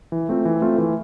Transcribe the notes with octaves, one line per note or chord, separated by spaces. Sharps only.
E3
A3 C4 F4
E3
A3 C4 F4
E3